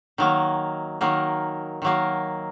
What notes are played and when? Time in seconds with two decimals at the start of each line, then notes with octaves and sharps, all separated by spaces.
0.18 D#3 F#3 A#3
1.01 D#3 F#3 A#3
1.82 D#3 F#3 A#3